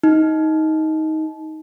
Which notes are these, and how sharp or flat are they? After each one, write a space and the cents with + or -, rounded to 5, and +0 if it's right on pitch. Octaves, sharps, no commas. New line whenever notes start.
D#4 +15